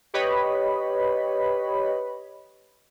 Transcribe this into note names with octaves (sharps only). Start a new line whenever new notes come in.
G4 B4 C#5 D#5 B5